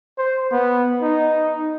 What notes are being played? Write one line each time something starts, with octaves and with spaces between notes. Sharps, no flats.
C5
B3
D#4